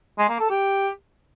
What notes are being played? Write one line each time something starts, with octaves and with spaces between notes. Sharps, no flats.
G#3
A#3
A4
G4